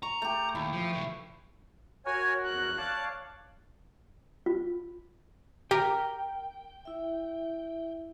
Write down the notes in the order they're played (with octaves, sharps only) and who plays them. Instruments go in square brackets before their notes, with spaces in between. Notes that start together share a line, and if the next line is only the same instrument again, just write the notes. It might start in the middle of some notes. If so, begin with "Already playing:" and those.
[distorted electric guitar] A#5 [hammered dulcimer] C#6
[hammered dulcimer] A3 G4
[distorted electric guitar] D#2 [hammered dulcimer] E4
[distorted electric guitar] F3
C#2 E3
[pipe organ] F#4 A#4 [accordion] C#5 G#5
[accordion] E2 [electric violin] F#6
[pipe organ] C#5 D5 F5 [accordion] A5
[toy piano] F4
[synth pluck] G4 [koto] A#4 [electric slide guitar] G5
[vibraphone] E4 E5